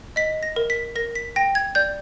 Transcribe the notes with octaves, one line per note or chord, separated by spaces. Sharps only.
D#5 B6
A#6
A#4
B6
A#4 A#6
B6
G5 A#6
G#6
D5 G6